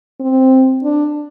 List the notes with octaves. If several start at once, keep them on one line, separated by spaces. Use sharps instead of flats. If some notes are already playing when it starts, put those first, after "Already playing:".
C4
D4